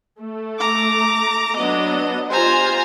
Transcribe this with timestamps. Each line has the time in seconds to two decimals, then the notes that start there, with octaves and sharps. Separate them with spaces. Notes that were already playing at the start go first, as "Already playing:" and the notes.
0.18 A3
0.59 A#5 D6
1.57 F#3 B3 D4 D#5
2.30 F4 G4 C5 G#5 A#5